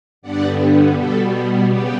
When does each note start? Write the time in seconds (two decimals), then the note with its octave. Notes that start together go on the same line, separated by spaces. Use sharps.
0.22 G2 D3 G3 B3 D5 F#5
0.94 B2 G3 B3 A4
1.66 C#3 G3 B3 G4